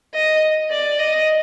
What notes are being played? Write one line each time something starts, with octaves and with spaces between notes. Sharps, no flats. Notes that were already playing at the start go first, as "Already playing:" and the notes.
D#5
D5
D#5